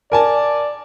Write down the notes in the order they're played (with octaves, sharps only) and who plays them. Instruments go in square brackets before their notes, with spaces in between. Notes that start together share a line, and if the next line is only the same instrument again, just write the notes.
[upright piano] A#4 G#5 A5 [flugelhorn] D5